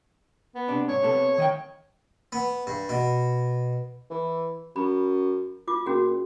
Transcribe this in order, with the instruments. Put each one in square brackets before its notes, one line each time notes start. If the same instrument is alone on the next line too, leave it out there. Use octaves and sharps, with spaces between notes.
[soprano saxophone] B3
[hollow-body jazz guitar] C3 D4
[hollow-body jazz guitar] G#2 [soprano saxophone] C#5
[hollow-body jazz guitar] C3 B3 A4
D#3 D#5 G5
[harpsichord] B3
G2
B2
[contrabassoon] E3
[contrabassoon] F#2 [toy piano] B5
[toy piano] F4 D6
[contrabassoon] A#2 [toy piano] C#4 F#4 G#4